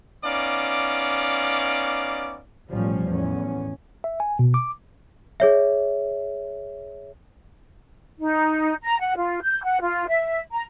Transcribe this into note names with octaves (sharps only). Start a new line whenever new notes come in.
B3 C#4 D#4 D5 F5 D6
A1 B2 F3 G3 C#4
E2 A2 C#4
E5
G#5
B2
D6
G#4 C#5 E5
D#4
A#5
F#5
F4
G6
F#5
F4
E5
A#5